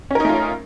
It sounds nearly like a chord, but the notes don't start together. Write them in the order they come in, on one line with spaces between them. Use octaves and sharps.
C#4 A#4 D#4 A3 F4